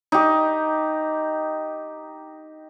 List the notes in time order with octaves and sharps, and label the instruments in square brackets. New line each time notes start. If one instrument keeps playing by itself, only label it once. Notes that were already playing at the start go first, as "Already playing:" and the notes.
[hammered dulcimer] D#4 G4